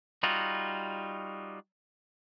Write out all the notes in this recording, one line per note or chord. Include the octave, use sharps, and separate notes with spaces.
G3 D#4 F4 F#4